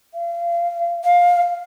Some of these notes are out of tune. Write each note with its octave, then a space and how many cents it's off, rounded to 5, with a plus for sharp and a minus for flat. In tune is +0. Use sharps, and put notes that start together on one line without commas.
F5 -30
F5 +15